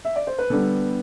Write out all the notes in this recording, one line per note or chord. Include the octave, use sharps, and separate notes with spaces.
E5
D5
C5
B4
D3 G3 B3 A4